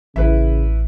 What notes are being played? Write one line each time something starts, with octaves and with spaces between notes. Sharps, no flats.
A1 C#3 E4 B4 E5